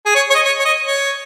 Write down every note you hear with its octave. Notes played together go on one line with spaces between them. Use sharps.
G#4
C#5
C#5
D#5
C#5
C#5
D#5
C#5